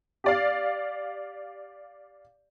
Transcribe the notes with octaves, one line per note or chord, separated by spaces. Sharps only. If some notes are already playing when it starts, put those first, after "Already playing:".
G4 D5 F5